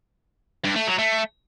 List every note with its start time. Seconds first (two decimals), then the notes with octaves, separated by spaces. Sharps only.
0.64 G2
0.76 A3
0.87 F#3
0.99 A3